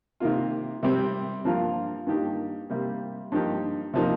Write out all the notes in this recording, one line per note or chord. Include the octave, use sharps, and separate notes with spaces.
C3 D#3 A#3 F4
C3 G3 C4
G2 F3 A#3 F4 A#4
G2 D#3 A#3 D#4 G4
C3 G3 A#3
G2 F3 A#3 D#4 G4
C3 F3 A#3 D#4